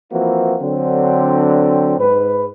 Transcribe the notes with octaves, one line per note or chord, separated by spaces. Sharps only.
E3 F3 A#3 C4 E4 F#4
D3 F#3 C4
G#2 B4